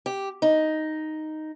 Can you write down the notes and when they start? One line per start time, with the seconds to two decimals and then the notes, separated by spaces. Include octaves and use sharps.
0.06 G4
0.42 D#4